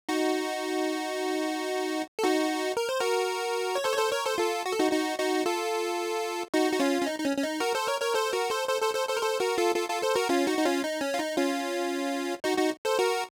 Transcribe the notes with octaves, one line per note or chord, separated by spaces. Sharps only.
D#4 F#4
A4
D#4 F#4
A#4
C5
F#4 A#4
C#5
A4 C5
C#5
A4 C5
A#4 C#5
A4 C5
F4 A4
F#4
A4
D#4 F#4
D#4 F#4
D#4 F#4
F4 A4
D#4 F#4
F#4
C#4 F4
C#4
D#4
D#4
C#4
C#4
D#4
F#4 A#4
A4 C5
A#4 C#5
A#4 C#5
A4 C5
F#4 A#4
A4 C5
A4 C5
A4 C5
A4 C5
A4 C5
A#4
A4 C5
F#4 A#4
F4 A4
F4 A4
F4 A4
A4 C5
F#4 A#4
C#4 F4
D#4 F#4
D#4
C#4 F4
D#4
C#4
F4
D#4
C#4 F4
D#4 F#4
D#4 F#4
A4 C5
F#4 A#4